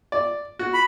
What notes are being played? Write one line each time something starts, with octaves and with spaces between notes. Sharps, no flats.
D5
F#4
B5